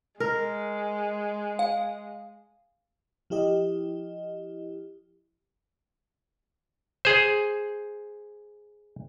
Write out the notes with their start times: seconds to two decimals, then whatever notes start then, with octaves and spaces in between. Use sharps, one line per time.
0.20 G#3 A#4
1.59 F5
3.30 F3 E4 G4 D#5
7.05 G#4 C5